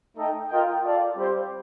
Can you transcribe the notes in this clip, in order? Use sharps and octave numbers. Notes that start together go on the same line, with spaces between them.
A3 D#4 A4 D#5 G5
F4 A#4 D#5 G5
F4 A4 D5 F5
G3 C4 G4 C5